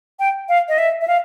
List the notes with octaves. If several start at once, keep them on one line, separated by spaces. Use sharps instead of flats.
G5
F5
D#5
E5
E5
F5